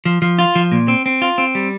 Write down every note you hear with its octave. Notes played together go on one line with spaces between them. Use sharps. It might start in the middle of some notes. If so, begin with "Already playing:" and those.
F3
F3
F4
F3
A#2
C4
C4
F4
C4
G3